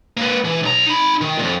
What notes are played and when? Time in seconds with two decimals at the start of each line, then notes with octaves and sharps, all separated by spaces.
0.17 A#3 B4
0.45 E3
0.63 B1 A#5
0.86 D#4 B5
1.21 D#3
1.38 F2 A#2